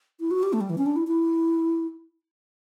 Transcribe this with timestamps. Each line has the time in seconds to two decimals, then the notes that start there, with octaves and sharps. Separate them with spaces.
0.20 E4
0.31 F#4
0.43 G4
0.53 A3
0.61 G3
0.70 E3
0.78 C#4
0.86 D4
0.96 E4
1.07 E4